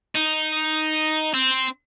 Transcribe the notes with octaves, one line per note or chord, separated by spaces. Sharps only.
D#4
C4